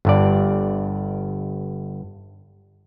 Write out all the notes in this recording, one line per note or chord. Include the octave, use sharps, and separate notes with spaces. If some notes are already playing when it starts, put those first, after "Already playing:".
G1 G2 D5